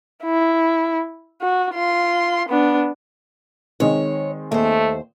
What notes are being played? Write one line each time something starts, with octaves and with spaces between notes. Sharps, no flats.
E4
F#4
F4 C6
B3 D4
D#3 G#3 C4 C#5
D#2 A3 C5